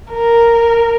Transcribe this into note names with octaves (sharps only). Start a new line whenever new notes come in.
A#4